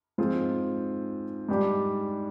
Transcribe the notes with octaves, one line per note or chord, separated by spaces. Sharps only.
G#2 F3 C4 F4 G#4
G#2 G3 D4 G4